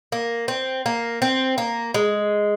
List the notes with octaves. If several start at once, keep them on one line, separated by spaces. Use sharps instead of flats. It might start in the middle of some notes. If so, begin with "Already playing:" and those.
A#3
C4
A#3
C4
A#3
G#3